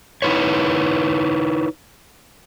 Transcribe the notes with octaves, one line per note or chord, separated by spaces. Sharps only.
D#4 E4 B4 C#5